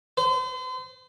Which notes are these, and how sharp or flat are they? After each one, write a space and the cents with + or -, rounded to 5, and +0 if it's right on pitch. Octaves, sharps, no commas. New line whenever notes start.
C5 -40